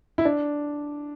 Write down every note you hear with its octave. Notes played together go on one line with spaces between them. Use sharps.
E4
D4